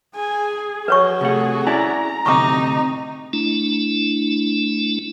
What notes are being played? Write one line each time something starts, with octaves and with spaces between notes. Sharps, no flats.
G#4 G#5
F#4 B4 C#5 C#6
C3 A3 G#4 F#5
C#4 E4 D5 G#5 A#5
D2 A2 C3 D#4 C#6 D6
A3 D4 E4